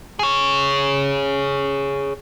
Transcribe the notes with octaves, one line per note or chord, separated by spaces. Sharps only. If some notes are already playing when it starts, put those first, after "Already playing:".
G#4 C#5